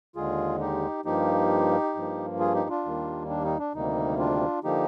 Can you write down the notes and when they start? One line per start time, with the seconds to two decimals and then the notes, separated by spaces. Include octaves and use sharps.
0.16 D#2 D3 G#3 F4 G#4
0.60 D#4 G4
1.05 G2 F3 A#3 D#4 G4
1.95 G2 F3 A#3
2.40 F4 G#4
2.54 D#4 G4
2.69 D4 F4
2.85 D#2 D#3 G3 A#3
3.30 D4
3.44 D#4
3.59 D4
3.74 D2 C3 D#3 G3 A#3 D#4
4.19 D4 F4
4.64 D3 F3 A#3 D#4 G4